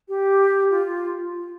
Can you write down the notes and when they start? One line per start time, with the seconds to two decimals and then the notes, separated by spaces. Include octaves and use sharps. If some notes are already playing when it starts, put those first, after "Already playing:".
0.08 G4
0.70 F4
1.31 F4